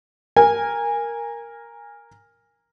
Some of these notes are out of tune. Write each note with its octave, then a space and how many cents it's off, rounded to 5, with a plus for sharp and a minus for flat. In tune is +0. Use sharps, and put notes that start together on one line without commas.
A#4 +0 G#5 -20